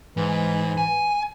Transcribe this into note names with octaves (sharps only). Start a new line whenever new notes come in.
G#2 E3
G#5